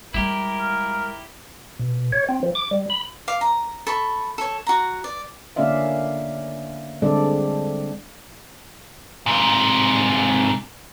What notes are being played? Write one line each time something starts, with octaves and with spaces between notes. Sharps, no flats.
G3 G#3 E4 G4 A#4
F5
B2
C#5
C4
F3
D6
G3
B5
F5 D6
A#5
A4 B5 C#6
A4 C#5
F#4 A#5
D5
D3 A#3 C#4 D5 E5 F5
D3 G3 G#3 C4 A4 D5
G#2 C3